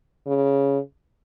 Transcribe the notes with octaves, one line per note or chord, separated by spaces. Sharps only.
C#3